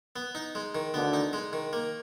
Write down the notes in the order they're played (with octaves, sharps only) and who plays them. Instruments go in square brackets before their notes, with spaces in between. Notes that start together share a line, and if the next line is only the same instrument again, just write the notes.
[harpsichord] B3
D#4
G#3
D#3
[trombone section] D2 D3 [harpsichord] B3
[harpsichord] D#4
G#3
D#3
A#3